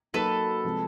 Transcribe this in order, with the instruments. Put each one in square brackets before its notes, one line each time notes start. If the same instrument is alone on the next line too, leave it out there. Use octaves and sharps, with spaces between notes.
[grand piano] F#3 A#3 D#4 F#4 [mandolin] A4 B4
[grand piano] C3 F3 G#3